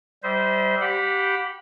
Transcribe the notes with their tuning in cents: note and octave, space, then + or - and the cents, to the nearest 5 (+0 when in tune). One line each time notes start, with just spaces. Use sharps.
G3 -15 C5 -20 E5 -45
G4 -10 F#5 -35 B5 +0